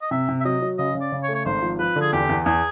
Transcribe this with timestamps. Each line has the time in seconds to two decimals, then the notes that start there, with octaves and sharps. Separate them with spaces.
0.02 D#5
0.11 C3 E5
0.29 C3
0.41 E5
0.45 F#3 D#5
0.62 F#3
0.78 C#3 D#5
0.95 C#3
1.01 D5
1.12 C#3
1.23 C#5
1.28 A3
1.35 C#5
1.46 G#1 C5
1.62 F3
1.79 F3 B4
1.96 D3
2.01 G#4
2.13 E2 G4
2.29 E2
2.46 E2 G#4